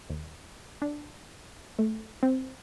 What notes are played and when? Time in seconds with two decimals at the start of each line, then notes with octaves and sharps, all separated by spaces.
0.10 D#2
0.82 D4
1.79 A3
2.23 C4